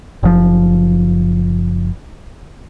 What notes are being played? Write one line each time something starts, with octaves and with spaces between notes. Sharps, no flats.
F#1 F3